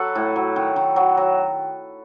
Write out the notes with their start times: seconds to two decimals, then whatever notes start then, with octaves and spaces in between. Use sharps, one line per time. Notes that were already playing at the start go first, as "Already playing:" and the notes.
Already playing: F#3 A4 B4
0.15 A2
0.36 F#3
0.56 D#3
0.76 D#3
0.96 F#3
1.17 F#3